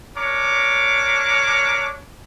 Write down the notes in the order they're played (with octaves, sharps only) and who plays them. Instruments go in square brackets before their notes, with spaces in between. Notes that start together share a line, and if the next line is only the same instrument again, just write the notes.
[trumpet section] D4 A#4 C#5 D6